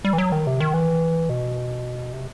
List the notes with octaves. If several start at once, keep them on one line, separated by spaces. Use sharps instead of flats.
G3
E3
F#3
D#3
C3
D#3
E3
B2
C3